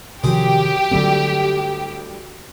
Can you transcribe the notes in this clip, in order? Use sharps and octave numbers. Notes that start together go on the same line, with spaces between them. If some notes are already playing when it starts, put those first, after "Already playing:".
F#2 C3 D#3 F3 C4 G4 G#4
D2 G2 D3 F#3 C4